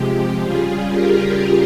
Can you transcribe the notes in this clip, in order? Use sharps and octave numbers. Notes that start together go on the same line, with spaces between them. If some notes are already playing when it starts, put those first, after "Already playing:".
Already playing: C3 F3 G#3 G4
C#3 G3 F4 G#4
G4 A#4